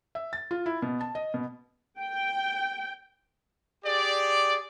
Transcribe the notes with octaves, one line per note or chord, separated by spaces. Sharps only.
E5
A6
F4
E4
B2
A5
D#5
B2
G5
G4 G#4 D5